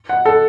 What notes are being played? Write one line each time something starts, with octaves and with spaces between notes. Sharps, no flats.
F#5
A4